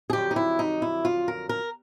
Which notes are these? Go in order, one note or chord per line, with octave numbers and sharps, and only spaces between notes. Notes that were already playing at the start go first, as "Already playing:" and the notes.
G#4
F2 D3 F#3 G4
D#4
E4
D#4
E4
F4
A#4
A#4